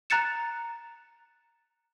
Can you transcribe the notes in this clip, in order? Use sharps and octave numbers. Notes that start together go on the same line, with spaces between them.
A#5 F#6 A6 C#7 E7